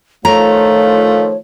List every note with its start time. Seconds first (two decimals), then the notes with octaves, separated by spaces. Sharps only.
0.25 D#3 F3 A3 F4 C#5 A#5